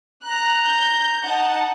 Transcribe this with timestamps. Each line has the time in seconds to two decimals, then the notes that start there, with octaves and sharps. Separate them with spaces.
0.24 A#5 F#6
0.65 G6
1.24 D#4 F#5 A5